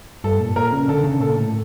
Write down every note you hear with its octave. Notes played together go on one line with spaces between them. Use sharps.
G2 A4
A#2
A#2 A#4
C#3
D3 A4
C#3
A#2 A4
A2